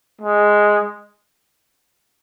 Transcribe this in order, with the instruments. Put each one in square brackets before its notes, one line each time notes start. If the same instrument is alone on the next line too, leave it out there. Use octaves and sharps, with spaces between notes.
[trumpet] G#3